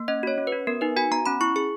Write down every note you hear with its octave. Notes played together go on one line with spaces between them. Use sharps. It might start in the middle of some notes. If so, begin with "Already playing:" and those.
Already playing: A#3
C#4 D#5
F#4 C#5
C#4
F#4 B4
B3 A#4
D#4 B4
F#4 G#5
B3 A#5
C#4 B5
E4 C#6
G#4 C#6